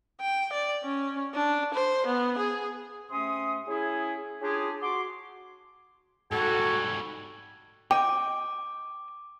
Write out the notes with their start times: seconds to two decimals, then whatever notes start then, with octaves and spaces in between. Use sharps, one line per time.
0.21 G5
0.53 D5
0.83 C#4
1.34 D4
1.74 C5
2.07 B3
2.38 G#4
3.11 C3 A3 C#4 C6 D#6
3.67 C#4 E4 G#4
4.42 C#4 D4 F4 G4 G#4
4.81 F#4 C6 D6
6.32 G#2 G3 F#4 A4 G#5
7.91 D#5 G5 D6